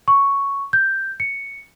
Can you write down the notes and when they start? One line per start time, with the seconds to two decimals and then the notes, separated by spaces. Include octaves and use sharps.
0.08 C#6
0.73 G6
1.20 C#7